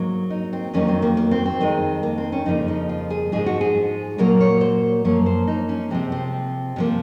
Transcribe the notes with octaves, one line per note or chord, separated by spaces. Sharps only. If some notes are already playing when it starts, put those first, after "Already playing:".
Already playing: G#2 F#3 A#3
D#4
C4
F2 D#3 F#3 A#3 C#4
C4
A#3
A#3
C4
C4
F2 D#3 G#3
A#3
C4
C#4
F2 C#3 F3 A#3 D#4
D#4
F4
G#4
G#2 F3 G#3 G#4
F#4
G#4
A#2 F#3 A#3 A#4
C#5
C5
F#2 F3 A#3 C#5
C5
D#4
C#4
C3 F3 G#3 C4
C4
C3 F3 A#3